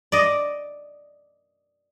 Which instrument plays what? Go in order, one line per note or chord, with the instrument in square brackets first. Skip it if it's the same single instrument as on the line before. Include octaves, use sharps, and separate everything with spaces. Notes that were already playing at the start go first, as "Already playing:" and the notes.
[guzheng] D5 D#5